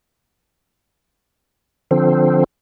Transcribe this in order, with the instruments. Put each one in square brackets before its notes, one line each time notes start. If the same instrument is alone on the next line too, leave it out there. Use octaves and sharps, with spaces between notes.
[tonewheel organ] D3 F3 C4